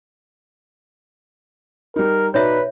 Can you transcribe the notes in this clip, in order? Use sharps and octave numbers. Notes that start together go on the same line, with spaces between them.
G3 D#4 A#4
B2 D#4 B4 C#5 D5 E5